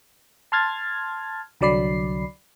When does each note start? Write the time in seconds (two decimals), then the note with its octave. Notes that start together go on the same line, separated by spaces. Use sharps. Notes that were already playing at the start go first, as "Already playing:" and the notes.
0.52 A5 C6 F6 G#6 A6
1.61 C2 D3 F#3 D5 B5 C7